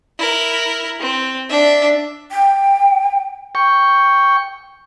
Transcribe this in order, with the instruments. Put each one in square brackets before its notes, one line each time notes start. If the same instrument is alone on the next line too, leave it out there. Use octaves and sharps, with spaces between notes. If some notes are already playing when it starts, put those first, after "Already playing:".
[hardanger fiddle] E4 A#4
C4
D4 E5
[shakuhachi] G5
[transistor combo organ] G5 C#6